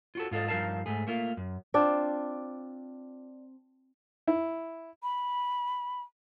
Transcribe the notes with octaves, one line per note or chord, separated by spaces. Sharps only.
F4 F#4 A4
G#2 F4 A4 D#5
G2 F3 D#4 A#4 F5 A5
G#2 A3 G#4
A3 A#3 F4
F#2
C4 D4 F4
E4
B5